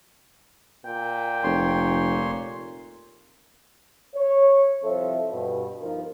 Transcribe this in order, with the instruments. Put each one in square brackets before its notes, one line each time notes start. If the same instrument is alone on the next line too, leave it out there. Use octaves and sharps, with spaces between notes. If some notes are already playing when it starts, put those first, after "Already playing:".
[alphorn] A#2 [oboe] G5
[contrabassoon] F1 [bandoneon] C#5 C6
[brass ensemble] C#5
C2 F3 C4 A4 C5 E5
G2 B2
G1 F3 D#4 A#4